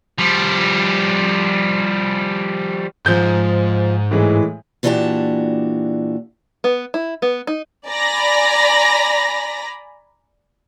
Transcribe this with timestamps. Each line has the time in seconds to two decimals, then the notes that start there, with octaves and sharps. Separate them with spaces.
0.18 F3 G3
3.06 G#2 F3 G6
4.11 A2 E3 G#3
4.83 A#2 E3 D4 F#4 G4 A5
6.64 B3
6.94 E4
7.22 B3
7.47 D#4
7.87 D5 G#5 A#5 B5 A#6